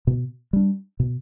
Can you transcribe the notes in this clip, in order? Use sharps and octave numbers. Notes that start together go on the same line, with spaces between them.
B2
G3 D4
B2